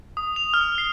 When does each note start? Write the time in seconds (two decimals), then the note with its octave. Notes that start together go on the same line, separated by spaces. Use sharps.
0.17 D#6
0.36 F7
0.54 F6
0.78 C7